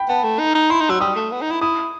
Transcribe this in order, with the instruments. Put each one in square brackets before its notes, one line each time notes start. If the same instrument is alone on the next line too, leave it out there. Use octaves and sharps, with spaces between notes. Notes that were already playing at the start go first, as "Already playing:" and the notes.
Already playing: [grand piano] G5 B5
[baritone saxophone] B3 [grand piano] A5
[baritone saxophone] A3
D#4
D#4
[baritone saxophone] E4 [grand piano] C6
[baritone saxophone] D#4
[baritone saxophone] F#3 [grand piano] E6
[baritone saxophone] G3 [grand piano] D#6
[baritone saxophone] A3
B3
D#4
E4
[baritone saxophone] E4 [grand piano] D#6